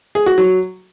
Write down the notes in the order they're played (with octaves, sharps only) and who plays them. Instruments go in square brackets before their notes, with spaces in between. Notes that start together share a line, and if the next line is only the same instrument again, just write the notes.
[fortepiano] G#4
F#4
F#3